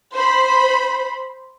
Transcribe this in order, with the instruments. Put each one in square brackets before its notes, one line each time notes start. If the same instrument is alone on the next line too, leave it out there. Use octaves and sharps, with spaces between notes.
[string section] C5 B5